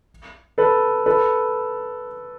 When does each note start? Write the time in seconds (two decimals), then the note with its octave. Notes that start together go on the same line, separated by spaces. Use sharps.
0.58 A4 B4
1.06 A4 B4